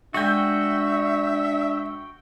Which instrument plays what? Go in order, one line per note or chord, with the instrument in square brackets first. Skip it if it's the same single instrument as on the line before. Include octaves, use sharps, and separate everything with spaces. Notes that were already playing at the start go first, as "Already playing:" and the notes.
[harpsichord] G#3 D#5 [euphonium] D4 [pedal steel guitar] F#4 G5 [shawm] E5